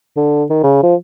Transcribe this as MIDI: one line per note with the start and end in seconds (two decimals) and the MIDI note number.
0.17 0.44 50
0.50 0.60 51
0.63 0.78 49
0.83 0.95 53